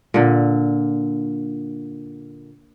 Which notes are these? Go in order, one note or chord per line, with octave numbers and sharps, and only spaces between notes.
A#2 D3